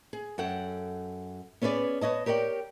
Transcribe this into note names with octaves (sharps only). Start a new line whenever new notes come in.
G#4
F#2 A4 F#5 G5
B3 C#4 G#4 B4 D5
B4 C#5 D#5 A5
G4 A#4 C#5 D5 G5